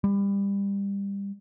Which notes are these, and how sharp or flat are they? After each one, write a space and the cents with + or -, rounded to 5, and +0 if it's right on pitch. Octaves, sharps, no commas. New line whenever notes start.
G3 +25